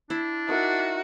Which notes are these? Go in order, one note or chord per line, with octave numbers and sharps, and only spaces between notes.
D4 E4
D#4 F#4 A#4 E5